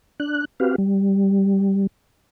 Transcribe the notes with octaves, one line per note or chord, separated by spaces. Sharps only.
D4 F#6
C4 F#4 G4 B4 F5
G3